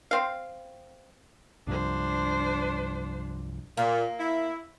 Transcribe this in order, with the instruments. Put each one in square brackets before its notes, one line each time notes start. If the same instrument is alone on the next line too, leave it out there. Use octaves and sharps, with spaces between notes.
[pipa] C4 F5
[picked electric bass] C2 G2 F3 [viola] D4 C5
[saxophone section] A#2 [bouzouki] A#3
[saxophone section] E4